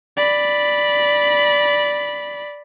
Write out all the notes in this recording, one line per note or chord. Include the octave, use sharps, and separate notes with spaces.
D5 B5